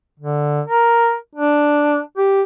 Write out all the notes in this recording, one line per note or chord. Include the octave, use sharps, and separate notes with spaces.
D3
A#4
D4
G4